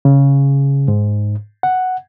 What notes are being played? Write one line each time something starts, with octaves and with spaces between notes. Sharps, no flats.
C#3
G#2
F#5